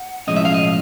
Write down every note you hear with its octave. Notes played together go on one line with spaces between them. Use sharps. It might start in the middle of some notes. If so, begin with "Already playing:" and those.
Already playing: F#5
B1 A2 F3 G#3 C#4 D#5
E5
F5
D#5